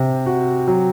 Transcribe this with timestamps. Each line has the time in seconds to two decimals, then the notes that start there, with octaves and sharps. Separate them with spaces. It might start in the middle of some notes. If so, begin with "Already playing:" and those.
Already playing: C3 C4
0.26 F#4
0.67 F#3